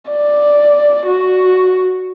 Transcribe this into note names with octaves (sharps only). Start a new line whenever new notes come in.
D5
F#4